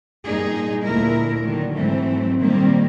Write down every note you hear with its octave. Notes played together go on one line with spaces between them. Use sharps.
G2 A#2 D#4 G#4
D2 A#2 A3 A#3 E4 A#4
D3 D#3 F#3
G#2 E3 F#3 A3 C4
A#2 D#3 G3 A#3 C4